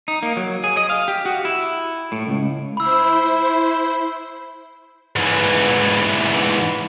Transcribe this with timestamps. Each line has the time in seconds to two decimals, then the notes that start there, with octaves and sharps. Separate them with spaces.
0.08 D#4
0.23 A#3
0.37 F#3
0.64 G#4
0.77 D#5
0.90 F5
1.08 G4
1.25 F#4
1.45 E4
2.12 A2
2.27 C#2
2.77 E4 C5 B5 E6
5.16 G#2 E3